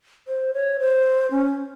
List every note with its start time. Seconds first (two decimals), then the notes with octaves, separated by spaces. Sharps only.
0.28 C5
0.54 C#5
0.80 C5
1.31 C#4